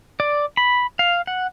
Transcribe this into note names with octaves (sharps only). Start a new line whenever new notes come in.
D5
B5
F5
F#5